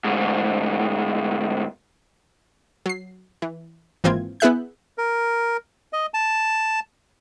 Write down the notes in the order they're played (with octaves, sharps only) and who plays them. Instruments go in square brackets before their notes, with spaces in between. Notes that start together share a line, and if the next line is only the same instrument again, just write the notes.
[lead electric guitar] D2 G#2
[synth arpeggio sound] F#3 C7
E3
G#1 E3 A#3 C4 F4 G#6
B3 E4 G#4 E5 F#6 G6
[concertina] A#4
D#5
A5